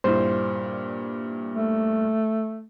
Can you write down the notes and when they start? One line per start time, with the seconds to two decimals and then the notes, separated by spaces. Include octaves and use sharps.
0.04 G2 A#2 E4 C5
1.54 A3